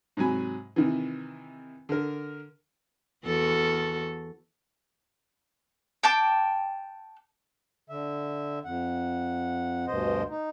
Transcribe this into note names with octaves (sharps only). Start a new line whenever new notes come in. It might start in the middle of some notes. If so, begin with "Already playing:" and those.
G#2 C3 F#3 G#5 B5
C3 D#3 E3
D3 A#4
E2 F#4 A4
G5 A5 D6
D3 E5
F2 F#5
D2 G2 B2 C5 D#5
D#4